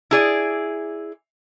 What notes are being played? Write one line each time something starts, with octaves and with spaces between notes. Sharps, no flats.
E4 G#4 D5